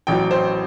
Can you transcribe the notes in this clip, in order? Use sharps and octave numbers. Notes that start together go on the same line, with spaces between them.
A1 A2 F#3 G5
C5